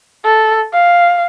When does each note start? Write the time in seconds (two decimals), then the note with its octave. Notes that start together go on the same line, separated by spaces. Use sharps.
0.25 A4
0.74 F5